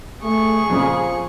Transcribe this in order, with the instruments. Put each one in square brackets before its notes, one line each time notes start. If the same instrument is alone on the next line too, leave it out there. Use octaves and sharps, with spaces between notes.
[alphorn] A3 [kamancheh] G#4 [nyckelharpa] C#6
[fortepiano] F2 A#2 C#3 [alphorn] F3